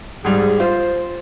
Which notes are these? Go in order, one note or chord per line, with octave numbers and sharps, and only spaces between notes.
G#2 G3 G#4
F4 C5